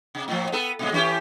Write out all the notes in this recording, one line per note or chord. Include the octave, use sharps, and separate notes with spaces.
C3
A2 F3
B3 A4
A#2 C#3 G#3
E3 C#4 G4